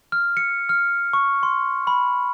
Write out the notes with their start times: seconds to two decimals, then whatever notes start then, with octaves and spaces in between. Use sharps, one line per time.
0.12 F6
0.37 C#7
0.69 F6
1.13 C#6
1.43 C6
1.87 B5